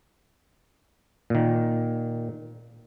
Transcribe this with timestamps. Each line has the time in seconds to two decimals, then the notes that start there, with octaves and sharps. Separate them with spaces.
1.30 A#2 D#3